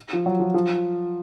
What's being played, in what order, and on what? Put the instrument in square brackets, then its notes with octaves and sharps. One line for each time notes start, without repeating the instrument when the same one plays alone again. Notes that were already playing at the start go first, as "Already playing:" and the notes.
[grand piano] F3
F#3
F3
F3